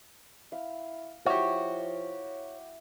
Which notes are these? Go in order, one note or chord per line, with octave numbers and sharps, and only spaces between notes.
E4 F5
F3 E4 F#4 G4 C#5